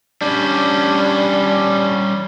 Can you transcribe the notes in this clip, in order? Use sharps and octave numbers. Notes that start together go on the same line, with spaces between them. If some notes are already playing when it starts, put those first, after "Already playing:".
G3 C#4 D4